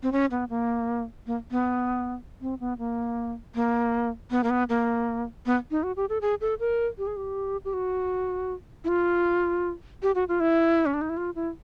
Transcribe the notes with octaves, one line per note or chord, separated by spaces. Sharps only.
C4
C#4
B3
A#3
A#3
B3
C4
B3
A#3
A#3
B3
A#3
B3
A#3
B3
D#4
F#4
G4
A4
G#4
A4
A#4
G4
G#4
G4
G4
F#4
E4
F4
G4
F#4
F4
E4
C#4
D4
D#4
E4
F4
E4